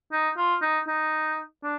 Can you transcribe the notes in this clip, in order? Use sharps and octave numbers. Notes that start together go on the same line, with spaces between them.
D#4
F4
D#4
D#4
D4